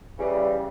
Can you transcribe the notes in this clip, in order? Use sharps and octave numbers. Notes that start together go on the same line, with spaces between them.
C#3 E3 G3